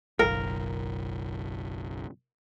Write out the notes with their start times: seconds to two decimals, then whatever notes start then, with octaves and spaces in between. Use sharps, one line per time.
0.19 F#1 B1 A#4